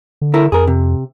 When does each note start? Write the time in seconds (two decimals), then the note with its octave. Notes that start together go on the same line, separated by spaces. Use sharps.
0.21 D3
0.34 E4 A4 A#4
0.52 F2 G#4 A#4
0.67 C3